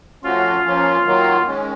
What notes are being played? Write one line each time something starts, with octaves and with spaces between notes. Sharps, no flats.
F3 A3 C#4 F4 F#4
F3 A#3 C#4
D#3 F#3 A#3
D#3 G#3 C#4